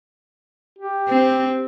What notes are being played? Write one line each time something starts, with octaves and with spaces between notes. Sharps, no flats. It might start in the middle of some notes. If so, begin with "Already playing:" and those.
G4
C4